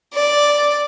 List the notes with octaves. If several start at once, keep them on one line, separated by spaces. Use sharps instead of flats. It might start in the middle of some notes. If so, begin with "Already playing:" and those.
D5